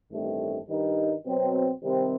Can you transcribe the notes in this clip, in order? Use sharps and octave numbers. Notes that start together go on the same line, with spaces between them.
A1 G2 D#3 A3 C4
G2 D#3 G3 D#4
B2 F#3 C4
C3 D#3 G3 C4